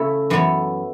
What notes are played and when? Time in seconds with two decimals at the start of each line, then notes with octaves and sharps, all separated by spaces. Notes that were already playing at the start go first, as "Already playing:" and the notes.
Already playing: C#3 A3 E4 A4 C#5
0.30 F#2 E3 B3 A4 C#5